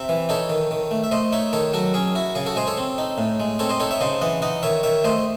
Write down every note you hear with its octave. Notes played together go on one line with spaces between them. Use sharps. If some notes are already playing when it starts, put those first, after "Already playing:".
Already playing: C3 E5
E3
D#4 A4 C#5
D#3
D#3
A3
E5
A3 C5 D#5
D#4 C#5 E5
D#3 A4 C#5
F#3 F#4 A4
C#4 G#4
E4 F#4
C#3 G#4
F#4 A4
G#3 G#4 C5
A4 C#5
C4
D#4
A2
G#3
C4 A4 C#5
C5 D#5
D#4 A4 C#5
C#5 E5
C#3 C5 D#5
E3 D#5 F#5
D#4 D#5 F#5
D#3 C#5 E5
D#3 C#5 E5
A3 C5 D#5